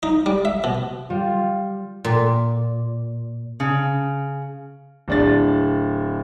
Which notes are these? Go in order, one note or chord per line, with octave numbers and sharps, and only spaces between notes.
D#4
G3
E5
B2
G3 F4
A#2
C#3
D1 D4 A6